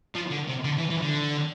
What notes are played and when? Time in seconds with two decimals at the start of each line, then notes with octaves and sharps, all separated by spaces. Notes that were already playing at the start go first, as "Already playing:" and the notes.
0.15 F3
0.31 D3
0.48 C3
0.64 D3
0.78 E3
0.90 E3
1.02 D3